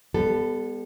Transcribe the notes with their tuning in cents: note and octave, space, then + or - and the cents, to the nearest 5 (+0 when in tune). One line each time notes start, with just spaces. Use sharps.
G3 +40 B3 +0 A4 +0